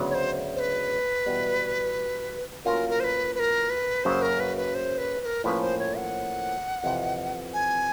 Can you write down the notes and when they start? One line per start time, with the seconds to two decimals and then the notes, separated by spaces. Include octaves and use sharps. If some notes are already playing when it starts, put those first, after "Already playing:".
Already playing: D2 C#3 F#3 B3
0.10 C#5
0.14 C5
0.55 C5
0.59 B4
1.26 E2 B2 G3 B3
2.65 A2 F#3 A#3 C#4 F4 A#4
2.90 A#4
3.00 C5
3.04 B4
3.35 B4
3.39 A#4
3.70 B4
4.04 F#2 C#3 F#3 A#3 C5
4.22 A#4
4.40 B4
4.57 B4
4.75 C5
4.98 B4
5.21 B4
5.25 A#4
5.44 A2 F3 A#3 C#4 B4
5.62 C5
5.79 C#5
5.97 F#5
6.84 F2 C3 E3
7.54 G#5